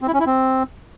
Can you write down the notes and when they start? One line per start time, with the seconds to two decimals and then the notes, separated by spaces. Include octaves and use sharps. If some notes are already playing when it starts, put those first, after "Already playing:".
0.02 C4
0.08 E4
0.14 C#4
0.20 E4
0.26 C4